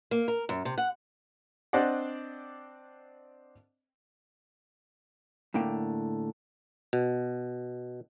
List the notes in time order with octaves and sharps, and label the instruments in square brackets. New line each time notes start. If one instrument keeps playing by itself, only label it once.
[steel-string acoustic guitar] A#3
A#4
F#2
C3
F#5
[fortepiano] C4 D4 C5 D5 D#5 F#5
[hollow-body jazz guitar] A2 D3 A#3 G5
[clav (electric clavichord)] B2